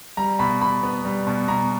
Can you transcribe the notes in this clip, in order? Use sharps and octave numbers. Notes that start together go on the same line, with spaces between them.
G3 A#5
B2 B5
B2 B5
B3
G3
B2
B2 A#5